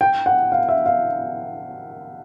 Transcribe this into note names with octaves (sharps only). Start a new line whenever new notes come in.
G5
F#5
F5
E5
F5